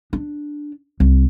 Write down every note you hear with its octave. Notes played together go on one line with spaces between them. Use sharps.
D4
C2